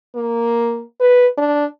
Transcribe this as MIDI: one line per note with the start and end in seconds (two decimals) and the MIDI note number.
0.15 0.82 58
1.00 1.27 71
1.37 1.65 62